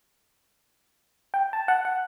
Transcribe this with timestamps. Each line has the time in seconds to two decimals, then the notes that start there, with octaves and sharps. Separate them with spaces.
1.34 G5
1.53 A5
1.68 F#5
1.85 F#5